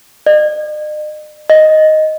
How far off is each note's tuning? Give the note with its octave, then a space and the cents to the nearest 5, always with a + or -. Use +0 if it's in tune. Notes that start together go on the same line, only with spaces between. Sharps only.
D#5 -45
D#5 +0